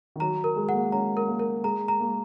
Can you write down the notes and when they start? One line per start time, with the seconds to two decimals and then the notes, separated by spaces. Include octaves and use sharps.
0.16 D#3
0.20 F#3 A#5
0.44 A#4
0.56 G#3
0.68 G#3 F#5
0.74 A#3
0.92 C#4 A#5
1.17 A#4
1.28 A#3
1.40 A#4
1.63 G#3 A#5
1.88 A#5
2.00 A#3